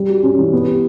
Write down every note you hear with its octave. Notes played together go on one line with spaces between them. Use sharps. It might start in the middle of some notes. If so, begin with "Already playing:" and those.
Already playing: G3
F#4
C#4
E3
B3
G4